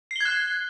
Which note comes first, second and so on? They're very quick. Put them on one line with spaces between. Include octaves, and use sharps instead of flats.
C7 G7 G#6 F#6